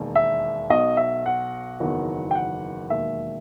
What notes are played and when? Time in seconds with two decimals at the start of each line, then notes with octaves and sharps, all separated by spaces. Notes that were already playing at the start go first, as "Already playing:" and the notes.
Already playing: E1 D#2 D#3
0.15 E5
0.70 B1 B2 F#3 D#5
0.97 E5
1.26 F#5
1.80 F#1 E2 D#3 F#3
2.31 G5
2.35 F#5
2.90 E1 D#2 D#3 F#3 E5